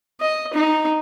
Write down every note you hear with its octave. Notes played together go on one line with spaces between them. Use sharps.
D#5
D#4